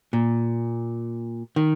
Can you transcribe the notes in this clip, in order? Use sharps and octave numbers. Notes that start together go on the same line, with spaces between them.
A#2
D#3